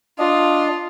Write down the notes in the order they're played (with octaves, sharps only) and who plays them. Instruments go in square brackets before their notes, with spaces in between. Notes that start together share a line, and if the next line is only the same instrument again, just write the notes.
[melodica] D4 D#5 [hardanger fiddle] F4